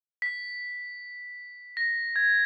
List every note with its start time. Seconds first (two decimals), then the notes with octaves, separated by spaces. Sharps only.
0.22 B6
1.77 A#6
2.16 G#6